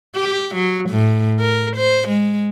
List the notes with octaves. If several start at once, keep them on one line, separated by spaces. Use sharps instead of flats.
G4
F#3
A2
A#4
C5
G#3